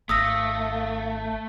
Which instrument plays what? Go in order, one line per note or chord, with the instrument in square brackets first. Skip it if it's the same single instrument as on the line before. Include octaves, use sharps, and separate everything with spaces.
[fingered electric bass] G#1 [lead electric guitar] A3 [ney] F5 [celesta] D#6 E6 A#6